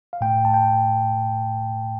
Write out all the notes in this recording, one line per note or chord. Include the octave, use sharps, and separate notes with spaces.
F5
A2 A3 G5
A5
G5